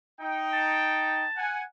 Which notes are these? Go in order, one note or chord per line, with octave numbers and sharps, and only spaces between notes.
D#4 G5
A5
F#5 G#5